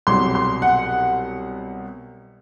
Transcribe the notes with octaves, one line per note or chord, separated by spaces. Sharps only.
C2 B2 F#3 C6
C6
F#5